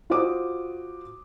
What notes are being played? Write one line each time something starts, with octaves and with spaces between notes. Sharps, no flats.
F4 F#4 C5 D6 D#6